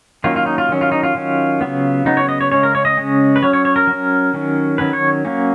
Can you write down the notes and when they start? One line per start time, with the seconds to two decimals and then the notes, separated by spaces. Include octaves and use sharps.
0.24 D#3 F#3 A#3 C#4 F4
0.36 F4
0.46 D#4
0.58 F4
0.69 D#3 F#3 C#4
0.81 F4
0.92 D#4
1.03 F4
1.15 D#3 F#3 C#4
1.61 C#3 F#3 B3
2.05 C#3 F#3 B3 D#4
2.17 C#5
2.29 D#5
2.41 C#5
2.52 C#3 G#3 C#4 C#5
2.63 A#4
2.75 C#5
2.85 D#5
2.97 C#3 G#3 C#4
3.36 B4
3.42 F#3 C#4 C#5
3.53 C#5
3.65 C#5
3.76 A#4
3.87 F#3
3.92 C#4
4.34 D#3 F#3 C#4
4.78 D#3 F#3 C#4 B4
4.93 C#5
5.25 F#3 A#3 C#4